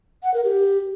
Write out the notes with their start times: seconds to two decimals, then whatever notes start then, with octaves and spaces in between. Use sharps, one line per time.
0.23 F#5
0.34 A#4
0.45 G4